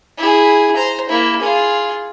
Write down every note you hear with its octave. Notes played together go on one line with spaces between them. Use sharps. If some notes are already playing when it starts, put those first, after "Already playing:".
E4 G#4
C5 A#5
A#3 E4
F4 G#4